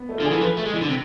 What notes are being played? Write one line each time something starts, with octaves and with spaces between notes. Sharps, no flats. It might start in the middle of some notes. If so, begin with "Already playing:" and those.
Already playing: B3
A3
D3 F4
G#4
E3 A4
F3 B4
A3
G#3
E3
D3
C3